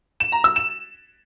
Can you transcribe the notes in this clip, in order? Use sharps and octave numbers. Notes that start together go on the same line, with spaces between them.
E7
A#5
E6
E7